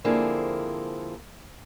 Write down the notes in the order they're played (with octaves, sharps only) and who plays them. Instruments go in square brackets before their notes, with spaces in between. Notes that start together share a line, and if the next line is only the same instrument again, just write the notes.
[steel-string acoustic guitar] D3 F3 A#3 C4 E4 G#4